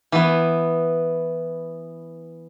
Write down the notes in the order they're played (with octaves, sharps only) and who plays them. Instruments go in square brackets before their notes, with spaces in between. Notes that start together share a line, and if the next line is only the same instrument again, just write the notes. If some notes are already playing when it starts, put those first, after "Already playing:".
[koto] E3 B3